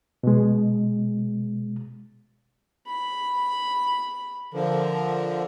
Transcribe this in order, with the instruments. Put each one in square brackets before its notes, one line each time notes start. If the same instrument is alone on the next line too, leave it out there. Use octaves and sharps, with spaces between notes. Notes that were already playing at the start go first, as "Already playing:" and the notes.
[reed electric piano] B2 G#3
[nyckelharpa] B5
[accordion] D3 F3 [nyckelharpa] A#4